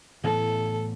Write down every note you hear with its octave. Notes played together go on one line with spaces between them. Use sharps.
A2 E3 B3 A4